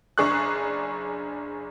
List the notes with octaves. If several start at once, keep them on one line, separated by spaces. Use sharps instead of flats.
F#1 D4 G#4 C#6 F#6